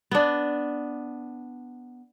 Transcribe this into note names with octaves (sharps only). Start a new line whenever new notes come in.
B3 D4